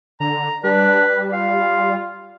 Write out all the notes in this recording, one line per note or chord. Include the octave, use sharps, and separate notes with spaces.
D3 A#5
G3 D4 B4
F4 F5